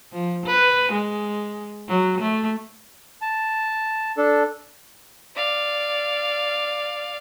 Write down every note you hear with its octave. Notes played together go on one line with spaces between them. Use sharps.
F3
B4
G#3
F#3
A3
A5
D4 A4
D5 F5